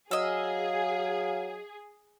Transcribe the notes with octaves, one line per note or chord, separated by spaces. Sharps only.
F#3 G#4 D#5 F5 E6